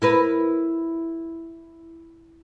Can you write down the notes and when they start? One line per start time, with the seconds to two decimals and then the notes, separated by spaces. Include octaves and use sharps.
0.02 E4 A#4 B4